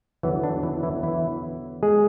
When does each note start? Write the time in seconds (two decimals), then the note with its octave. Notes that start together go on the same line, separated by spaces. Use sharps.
0.23 E2 D3 E3 F#3 B3 E4
0.43 D4
0.63 E3 E4
0.83 E3 E4
1.03 E3 E4
1.83 G#3 G#4